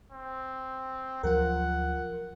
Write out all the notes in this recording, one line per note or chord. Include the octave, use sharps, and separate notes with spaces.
C4
D2 F3 F#3 F4 A#4 F#5